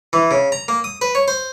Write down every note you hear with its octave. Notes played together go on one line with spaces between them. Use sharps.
E3
C#3
A#5
A#3
D#6
B4
C#5
C5